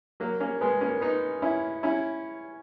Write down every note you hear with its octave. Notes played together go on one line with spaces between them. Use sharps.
F#3 A#3
A#3 C#4
G#3 B3
A#3 C#4
B3 D#4
C#4 E4
C#4 E4